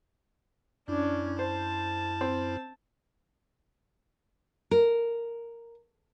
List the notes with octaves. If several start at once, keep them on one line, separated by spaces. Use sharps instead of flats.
F#2 C#4 D4 E4
C5 A5
C4
A#4